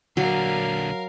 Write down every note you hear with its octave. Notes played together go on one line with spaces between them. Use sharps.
A#2 D3 F#3 A#4 F5